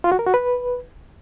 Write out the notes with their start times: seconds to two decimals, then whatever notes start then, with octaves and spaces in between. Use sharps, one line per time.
0.04 F4
0.12 F#4
0.19 A#4
0.26 F#4
0.34 B4